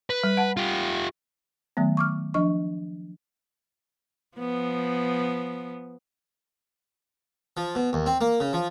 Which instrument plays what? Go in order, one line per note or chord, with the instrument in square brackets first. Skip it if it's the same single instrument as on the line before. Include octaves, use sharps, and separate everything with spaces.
[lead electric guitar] B4
[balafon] G3
F#5 A5
[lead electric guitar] F4 G4
[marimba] D#3 F#3 A3 B3
C#6 D6 F6
F3 D4 D#5 C#6
[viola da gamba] F3 B3
[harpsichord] F3
B2
D#2
C4
A#3
C#3
F3